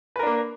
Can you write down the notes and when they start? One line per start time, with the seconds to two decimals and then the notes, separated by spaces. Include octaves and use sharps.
0.16 B4
0.19 A#4
0.23 D4
0.27 A#3